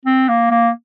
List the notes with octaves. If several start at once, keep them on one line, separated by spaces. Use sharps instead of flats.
C4
A#3
A#3